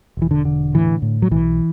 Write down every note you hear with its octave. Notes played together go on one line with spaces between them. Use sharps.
E1 E3
D3
D3
A2 E3
A2
F#3
B1 E3